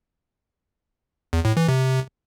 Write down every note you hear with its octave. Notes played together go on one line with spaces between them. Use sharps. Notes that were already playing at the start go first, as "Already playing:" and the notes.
E2
A2
E3
C3